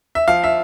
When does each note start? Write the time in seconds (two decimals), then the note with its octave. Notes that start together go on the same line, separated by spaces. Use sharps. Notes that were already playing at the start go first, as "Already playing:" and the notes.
0.15 E5
0.27 F3 F5
0.44 E5